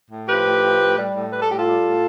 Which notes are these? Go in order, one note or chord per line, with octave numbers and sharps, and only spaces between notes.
A2
F3 G4 B4
A2
F3
A2
G3
A2
G3 B4
A4
A2 G4
F4 A4
G3
A2